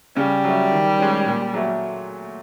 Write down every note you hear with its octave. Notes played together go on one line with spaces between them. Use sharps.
C#3 G3
F#3 A3
D#3
G#3 C#4
A#2
F#3 A3